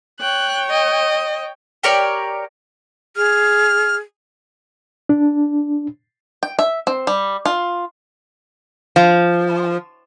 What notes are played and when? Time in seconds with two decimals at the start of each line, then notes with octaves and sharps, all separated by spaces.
0.20 C#5 G5 F#6
0.70 D#5
1.83 G4 A#4 C#5 D5
3.17 G#4 F6
5.09 D4
6.43 G5
6.59 E5
6.87 C4
7.07 G3
7.45 F4
8.96 F3